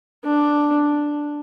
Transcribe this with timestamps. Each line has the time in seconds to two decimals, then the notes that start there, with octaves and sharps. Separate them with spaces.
0.24 D4